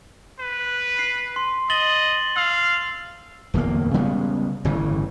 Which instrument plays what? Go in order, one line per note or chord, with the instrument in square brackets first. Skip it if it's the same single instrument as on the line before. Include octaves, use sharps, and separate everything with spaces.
[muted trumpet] B4
[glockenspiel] C7
C6
[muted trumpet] D#5 [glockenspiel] A6 F#7 G7
[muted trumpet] F5 [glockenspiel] E6
[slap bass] D1 E2 D#3 A#3
C#3 G3 G#3 B3
G1 A2 C#3 E3